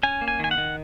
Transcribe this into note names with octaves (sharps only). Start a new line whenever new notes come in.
C#4 G#5
A#3
G#5
D#3 G#5
F#5
D#3